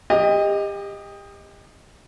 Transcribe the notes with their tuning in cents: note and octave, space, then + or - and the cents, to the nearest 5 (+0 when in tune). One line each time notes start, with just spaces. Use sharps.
G4 +30 D#5 +0